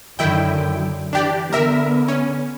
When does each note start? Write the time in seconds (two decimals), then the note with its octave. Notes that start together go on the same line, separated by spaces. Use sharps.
0.19 F#2 D3 D#3 E4 G5
1.13 E3 D4 G4 D5
1.53 D3 B3 A#4 E5
2.08 C#4